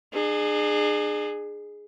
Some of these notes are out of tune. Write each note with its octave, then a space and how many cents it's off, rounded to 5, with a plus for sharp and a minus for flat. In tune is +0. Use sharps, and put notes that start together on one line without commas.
D4 +45 G#4 +0